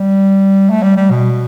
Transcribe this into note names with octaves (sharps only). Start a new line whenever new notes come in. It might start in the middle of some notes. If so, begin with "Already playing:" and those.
Already playing: G3
A3
G3
G3
B2